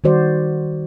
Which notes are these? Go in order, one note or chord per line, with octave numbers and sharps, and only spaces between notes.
D#3 G3 F#4 C5 D5